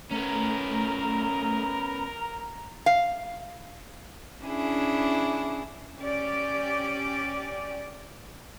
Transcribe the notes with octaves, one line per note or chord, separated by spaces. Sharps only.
A3 B3 C#4 A#4 A#5
F5
C#4 D4 E4 G#4
C#4 G4 D5